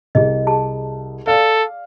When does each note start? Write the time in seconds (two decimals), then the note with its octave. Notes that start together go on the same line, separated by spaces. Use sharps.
0.15 C2 G#4 D#5
0.47 G#4 A5
1.27 A4 D5 F5